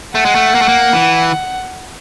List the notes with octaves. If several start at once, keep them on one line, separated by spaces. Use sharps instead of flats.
A3 F#5
G#3
A3
A#3
A3
A#3
E3